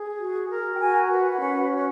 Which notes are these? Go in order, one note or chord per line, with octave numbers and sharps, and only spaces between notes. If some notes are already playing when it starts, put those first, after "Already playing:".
Already playing: G#4
F#4
A#4
G5
F#4 G#5
B4
C#4 F#5
F#4